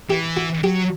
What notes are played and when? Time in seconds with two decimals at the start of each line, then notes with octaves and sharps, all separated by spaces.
0.10 E3 G4
0.37 F#4
0.63 F#3 G4